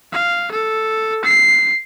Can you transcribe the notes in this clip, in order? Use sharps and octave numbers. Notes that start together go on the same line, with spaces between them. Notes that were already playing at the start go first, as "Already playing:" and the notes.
F5
A4
C7